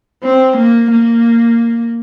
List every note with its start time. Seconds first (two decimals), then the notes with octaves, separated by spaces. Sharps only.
0.24 C4
0.57 A#3
0.91 A#3